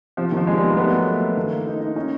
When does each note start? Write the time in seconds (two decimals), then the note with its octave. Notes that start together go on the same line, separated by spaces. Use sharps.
0.17 C3 F3
0.32 D#3 F3
0.47 C3 G#3
0.57 G3
0.62 B3
0.70 A#3
0.77 A3 B3
0.92 F#3
1.07 A3
1.21 A3
1.37 D#3
1.52 A#3
1.66 D#4
1.81 D#4
1.96 C#4 D#4